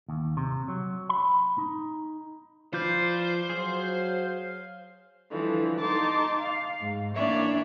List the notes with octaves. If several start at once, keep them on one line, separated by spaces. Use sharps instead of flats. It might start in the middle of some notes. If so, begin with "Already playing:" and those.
D#2
C3
F#3
B5
D#4
F3 F4 B4 C5 D5 F5 G6
F#3 G#4 F5 C6
D3 E3 F3 G3
D#4 A5 C6 D6
F5
G#2
E3 A#3 D4 C#5 D5 E5